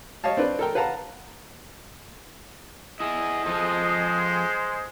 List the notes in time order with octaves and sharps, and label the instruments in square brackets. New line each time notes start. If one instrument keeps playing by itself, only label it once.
[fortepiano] C#5 D#5 F5 A5
C4 D4 B4
A4 A#4 G5
B4 F5 F#5 A5 A#5
[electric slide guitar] E4 G#4 [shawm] D#5
[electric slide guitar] F3 A4 [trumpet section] G#3 G#4 C5